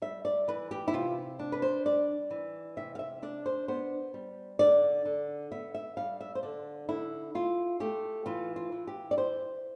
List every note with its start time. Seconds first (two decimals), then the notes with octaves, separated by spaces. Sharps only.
0.02 G3 E5
0.25 D5
0.48 E3 B4
0.71 G4
0.88 E4
0.93 C3 F4
1.39 D4
1.52 B4
1.62 C5
1.85 G3 D5
2.31 E3
2.77 C3 E5
2.95 F5
2.99 E5
3.22 D4 D5
3.46 C5
3.68 B3 C5
4.14 G3
4.59 D3 D5
5.05 D3
5.52 B3 E5
5.74 E5
5.97 G3 F5
6.21 E5
6.35 C5
6.43 D3 D5
6.88 D3 E4
7.35 E4 F4
7.80 A3 G4
8.26 E3 F4
8.56 F4
8.72 E3
8.87 G4
9.11 D5
9.17 E4 C5